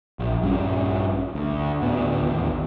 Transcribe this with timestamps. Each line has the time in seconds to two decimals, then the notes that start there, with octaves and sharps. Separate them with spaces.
0.19 A#1
0.42 A#1 G2 G3 C#4
1.35 D2
1.81 D2 A2 B3
2.23 A1 D#2